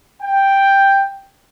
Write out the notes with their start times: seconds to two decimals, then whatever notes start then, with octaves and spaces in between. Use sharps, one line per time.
0.22 G5